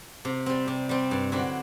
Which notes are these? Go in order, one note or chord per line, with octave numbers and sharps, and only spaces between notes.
C3
G3 C4
C3
G3 C4
G2
D3 F#3 C4 E4